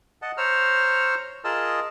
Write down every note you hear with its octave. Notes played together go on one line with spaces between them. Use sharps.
D#5 F#5 A5
C5 C#5 A#5 E6 F6
F4 G#4 A#4 D#5 A5 E6